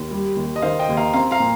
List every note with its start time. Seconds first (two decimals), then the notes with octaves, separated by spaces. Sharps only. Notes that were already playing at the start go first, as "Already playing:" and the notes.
Already playing: D#2
0.11 G3
0.36 D#2
0.56 D#5
0.62 D#3 C5 F5
0.79 D#5 G5
0.89 D#2
0.97 F5 A#5
1.14 C4 F5 A#5
1.31 F5 A#5
1.40 A#2